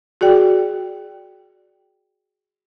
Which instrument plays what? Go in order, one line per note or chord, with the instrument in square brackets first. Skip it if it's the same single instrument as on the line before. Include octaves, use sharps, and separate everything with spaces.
[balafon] F#4 G#4 D5 G5